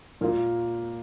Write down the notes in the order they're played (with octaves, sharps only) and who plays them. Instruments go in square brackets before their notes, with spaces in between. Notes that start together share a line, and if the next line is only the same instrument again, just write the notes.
[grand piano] A#2 A#3 F4